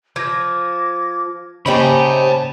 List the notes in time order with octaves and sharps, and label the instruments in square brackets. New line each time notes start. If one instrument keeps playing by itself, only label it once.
[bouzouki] F3 [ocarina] D6 [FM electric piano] G#6 A#6
[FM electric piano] C#3 A#3 [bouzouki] C#4 D#4 G4 [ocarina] C5 [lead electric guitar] A5 B5